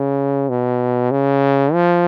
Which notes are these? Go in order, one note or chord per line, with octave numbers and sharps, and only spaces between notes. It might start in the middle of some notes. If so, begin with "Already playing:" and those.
Already playing: C#3
B2
C#3
F3